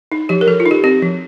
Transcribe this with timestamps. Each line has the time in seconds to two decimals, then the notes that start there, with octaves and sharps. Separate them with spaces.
0.12 D#4
0.29 F3 G4
0.41 A#4
0.47 F3 A4
0.60 F4
0.66 D#4
0.71 G4
0.84 C4 G4
1.02 F3